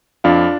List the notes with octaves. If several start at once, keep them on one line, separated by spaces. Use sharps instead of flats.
F2 D4 F4